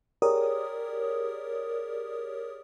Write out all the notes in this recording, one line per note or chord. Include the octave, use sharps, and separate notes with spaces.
G4 G#4 A#4 C#5 D5 D#6